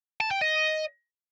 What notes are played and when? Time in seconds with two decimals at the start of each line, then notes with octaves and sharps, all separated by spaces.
0.21 A5
0.31 G5
0.42 D#5